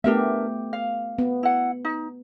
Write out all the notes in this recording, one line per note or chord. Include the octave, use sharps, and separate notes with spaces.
A3 B3 D4 G4 A#4 E5
F5
B3
E4 F#5
D#4